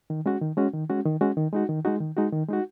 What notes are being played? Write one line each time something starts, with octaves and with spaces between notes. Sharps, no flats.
D#3
G#3 C#4 F#4
D#3
G#3 C#4 F#4
D#3
G#3 C#4 F#4
D#3
G#3 C#4 F#4
D#3
G#3 D#4 F#4
D#3
G#3 D#4 F#4
D#3
G#3 D#4 F#4
D#3
G#3 D#4 F#4